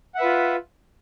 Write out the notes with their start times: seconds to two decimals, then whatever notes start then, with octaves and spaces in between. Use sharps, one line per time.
0.15 F#5
0.18 E5
0.21 B4
0.23 F4